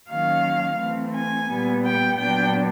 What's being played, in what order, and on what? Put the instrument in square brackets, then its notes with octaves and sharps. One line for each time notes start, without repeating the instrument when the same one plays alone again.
[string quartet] D#3 F#3 A#3 C#4 F5
E3 A3 C4
G#5
A#2 G3 B3
G5
A#2 F#3 B3 D4 G5